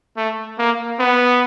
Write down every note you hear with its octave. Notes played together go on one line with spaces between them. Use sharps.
A3
A#3
B3